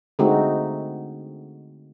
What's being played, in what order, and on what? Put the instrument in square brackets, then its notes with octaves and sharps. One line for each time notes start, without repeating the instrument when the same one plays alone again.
[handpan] D3 G#3 A3 C4 D#4 F#4